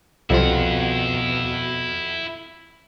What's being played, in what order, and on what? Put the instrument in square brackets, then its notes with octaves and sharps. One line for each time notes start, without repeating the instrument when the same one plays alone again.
[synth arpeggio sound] C2 [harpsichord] F2 F4 [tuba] B2 [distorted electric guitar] E4 F#5